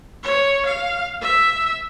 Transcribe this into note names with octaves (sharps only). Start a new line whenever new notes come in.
C#5
F5
E5